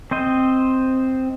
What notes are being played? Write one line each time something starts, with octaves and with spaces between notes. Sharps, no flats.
C4 C5 D#5